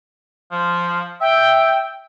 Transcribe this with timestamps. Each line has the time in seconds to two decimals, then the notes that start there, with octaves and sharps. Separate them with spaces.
0.51 F3
1.21 E5 G5